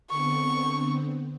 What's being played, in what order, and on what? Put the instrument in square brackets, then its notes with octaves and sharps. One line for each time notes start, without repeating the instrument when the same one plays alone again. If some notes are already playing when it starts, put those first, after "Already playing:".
[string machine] D3 B3 C4 [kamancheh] C#6